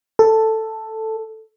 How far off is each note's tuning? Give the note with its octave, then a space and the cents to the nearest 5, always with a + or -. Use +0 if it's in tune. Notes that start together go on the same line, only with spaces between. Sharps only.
A4 +5